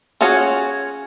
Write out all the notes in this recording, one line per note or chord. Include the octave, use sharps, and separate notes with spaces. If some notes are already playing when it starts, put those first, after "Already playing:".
C#4 F4 F#4 G#4 C#5